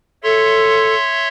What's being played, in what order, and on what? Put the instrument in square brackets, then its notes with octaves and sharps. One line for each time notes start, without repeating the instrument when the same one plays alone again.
[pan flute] A4 [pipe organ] C#5 E5 C6